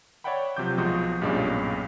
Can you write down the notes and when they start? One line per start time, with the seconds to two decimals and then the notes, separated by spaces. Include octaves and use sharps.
0.24 C#5 D5 E5 F#5 G5 B5
0.57 C3 F3 F#3 D6 G6
0.78 B1 F3 G#3 F#4 C6 D#6
1.22 B1 G2 A#2 G#3 C#4 D5